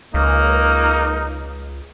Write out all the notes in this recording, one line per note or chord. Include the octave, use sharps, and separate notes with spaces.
C#2 A#3 D#4